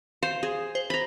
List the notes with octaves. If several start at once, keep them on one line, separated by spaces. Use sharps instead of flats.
C5 F5
G#4
C5
A#5 B5